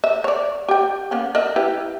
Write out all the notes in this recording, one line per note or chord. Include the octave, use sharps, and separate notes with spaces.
E5
C#5 D5
G4 G5
A#3 B3 C#4
A#4 D#5 E5
E4 G4 B4